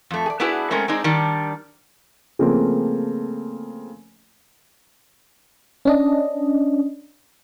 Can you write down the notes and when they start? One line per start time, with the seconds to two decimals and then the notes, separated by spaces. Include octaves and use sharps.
0.11 F2 A3
0.26 G#4 D5
0.40 B3 D4 E4 F#4 G#4 B4
0.71 G#3 A3 C4 C#4 A#4
0.88 G#3 C4 D4 D#4 G#4
1.04 D#3 G3 D4
2.39 C#3 F3 A3 A#3 C4
5.85 C#4 D4 D#5